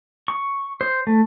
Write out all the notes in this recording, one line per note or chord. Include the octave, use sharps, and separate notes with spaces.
C#6
C5
A3